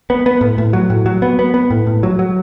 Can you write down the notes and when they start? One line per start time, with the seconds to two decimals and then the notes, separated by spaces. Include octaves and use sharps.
0.10 B3
0.26 B3
0.41 A2
0.58 A2
0.73 F#3
0.90 A2
1.06 F#3
1.22 B3
1.39 B3
1.54 B3
1.70 A2
1.87 A2
2.03 F#3
2.19 F#3